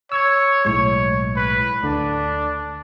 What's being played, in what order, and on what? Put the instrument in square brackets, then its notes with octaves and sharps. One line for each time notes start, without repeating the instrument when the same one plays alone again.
[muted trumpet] C#5 [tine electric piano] E6 G#6
[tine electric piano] B1 A2 G#3 [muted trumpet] C#5
[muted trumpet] B4
[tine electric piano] D2 D3 [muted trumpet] D4